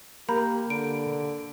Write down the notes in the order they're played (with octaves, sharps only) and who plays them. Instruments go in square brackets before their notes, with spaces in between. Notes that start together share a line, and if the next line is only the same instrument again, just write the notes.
[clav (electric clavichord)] A#3 [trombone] G4 [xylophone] A#5 B5 G6
[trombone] D3 [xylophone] D7